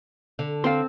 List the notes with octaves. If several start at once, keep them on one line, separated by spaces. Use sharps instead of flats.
D3
C4 F5 G5 C6